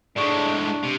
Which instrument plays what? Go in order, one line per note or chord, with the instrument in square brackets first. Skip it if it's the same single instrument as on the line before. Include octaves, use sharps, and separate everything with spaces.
[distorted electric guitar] A2 G#3 [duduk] D4 [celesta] D5 C#6 D7
[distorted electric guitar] C3